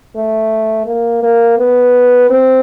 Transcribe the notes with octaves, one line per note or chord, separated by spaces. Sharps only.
A3
A#3
A#3
B3
C4